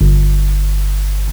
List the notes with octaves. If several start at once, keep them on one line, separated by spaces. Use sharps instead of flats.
G1